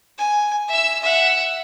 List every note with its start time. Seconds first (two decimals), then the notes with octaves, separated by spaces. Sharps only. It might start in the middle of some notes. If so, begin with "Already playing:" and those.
0.18 G#5
0.68 E5 E6
1.02 E5 F#5